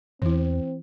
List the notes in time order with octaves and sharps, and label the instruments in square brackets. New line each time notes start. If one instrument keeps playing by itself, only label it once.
[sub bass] E2 [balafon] E3 E4 [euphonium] C4